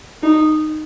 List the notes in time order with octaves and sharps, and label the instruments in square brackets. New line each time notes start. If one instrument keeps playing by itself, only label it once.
[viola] D#4